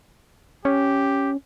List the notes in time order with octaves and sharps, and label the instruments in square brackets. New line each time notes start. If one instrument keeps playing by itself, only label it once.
[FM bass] C#4 [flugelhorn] G4